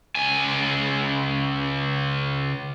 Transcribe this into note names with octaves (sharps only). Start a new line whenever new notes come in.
C#2 G#5